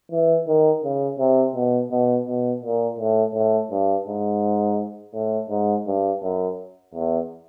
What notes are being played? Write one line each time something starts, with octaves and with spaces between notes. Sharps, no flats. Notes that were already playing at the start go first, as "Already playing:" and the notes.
E3
D#3
C#3
C3
B2
B2
B2
A#2
A2
A2
G2
G#2
A2
G#2
G2
F#2
E2